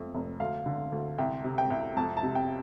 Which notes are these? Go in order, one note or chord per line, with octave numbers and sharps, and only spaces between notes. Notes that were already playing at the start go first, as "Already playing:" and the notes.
Already playing: F2 A3
F1
D2 F5
D3
D2
C2 G5
C3
G5
C2
F2 A5
A5
C3
G5